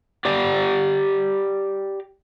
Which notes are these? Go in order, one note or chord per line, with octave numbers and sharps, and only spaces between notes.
G4 D5 G5 A#5